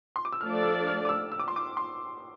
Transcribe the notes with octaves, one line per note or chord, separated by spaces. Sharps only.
C6
D6
E6
F3 A3 D4 A4 D5 F6
E6
F6
D6
E6
E6
D6
C6
D6
C6